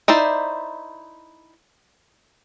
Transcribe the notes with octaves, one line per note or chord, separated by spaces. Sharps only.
D#4 E4 C5 D5